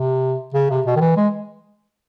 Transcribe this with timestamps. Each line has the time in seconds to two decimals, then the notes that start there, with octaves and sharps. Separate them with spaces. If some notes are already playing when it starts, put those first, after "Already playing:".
Already playing: C3
0.54 C#3
0.70 C3
0.86 B2
0.96 D#3
1.01 E3
1.17 G#3